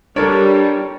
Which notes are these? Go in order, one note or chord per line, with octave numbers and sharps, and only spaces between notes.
G3 D4 A4 A#4 C#5